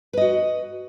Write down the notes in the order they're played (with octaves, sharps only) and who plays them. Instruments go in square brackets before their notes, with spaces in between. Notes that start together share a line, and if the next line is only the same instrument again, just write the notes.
[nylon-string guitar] B4
D#5
F#4